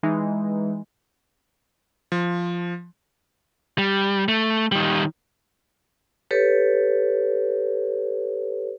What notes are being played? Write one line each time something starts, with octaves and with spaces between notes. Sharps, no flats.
E3 G#3 D#4
F3
G3
A3
D#3 G3
G4 A4 B4 C#5